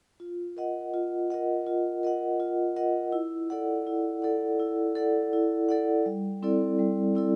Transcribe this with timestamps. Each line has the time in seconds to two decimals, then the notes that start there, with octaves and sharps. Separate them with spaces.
0.20 F4
0.57 A#4 D#5 F#5
0.94 F4
1.30 A#4 D#5 F#5
1.66 F4
2.03 A#4 D#5 F#5
2.40 F4
2.76 A#4 D#5 F#5
3.12 E4
3.50 A4 D5 F#5
3.87 E4
4.22 A4 D5 F#5
4.60 E4
4.95 A4 D5 F#5
5.33 E4
5.69 A4 D5 F#5
6.06 G3
6.43 C4 E4 A4 D5
6.79 G3
7.15 C4 E4 A4 D5